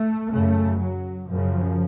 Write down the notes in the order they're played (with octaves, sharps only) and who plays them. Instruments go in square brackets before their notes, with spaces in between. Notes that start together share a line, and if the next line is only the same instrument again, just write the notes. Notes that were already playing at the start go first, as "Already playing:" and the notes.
Already playing: [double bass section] A3
F#2 C#3 A3
F#3
F#2 C#3 F3